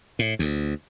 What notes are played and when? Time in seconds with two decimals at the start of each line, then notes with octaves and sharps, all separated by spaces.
0.19 A2
0.39 D2